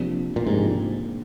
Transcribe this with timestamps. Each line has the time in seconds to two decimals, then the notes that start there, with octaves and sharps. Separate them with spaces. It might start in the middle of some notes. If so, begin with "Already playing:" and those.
Already playing: C3 F3 A#3 D4 G4
0.36 A#2
0.46 G#2 C3 F3 A#3 D4 G4